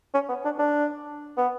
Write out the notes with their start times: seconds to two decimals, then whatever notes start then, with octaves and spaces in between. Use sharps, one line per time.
0.14 C#4
0.29 B3
0.45 D4
0.59 D4
1.37 B3